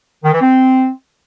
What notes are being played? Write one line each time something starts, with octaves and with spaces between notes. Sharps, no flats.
D#3
E3
C4